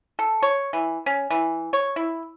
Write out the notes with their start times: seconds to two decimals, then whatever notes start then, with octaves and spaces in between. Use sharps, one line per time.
0.19 A4
0.43 C#5
0.73 E3
1.06 C#4
1.30 E3
1.73 C#5
1.96 E4